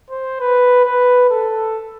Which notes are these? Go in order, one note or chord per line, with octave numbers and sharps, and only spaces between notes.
C5
B4
B4
A4